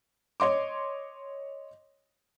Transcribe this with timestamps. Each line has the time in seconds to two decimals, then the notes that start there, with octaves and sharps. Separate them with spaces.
0.40 C#5 D#5 C6 D6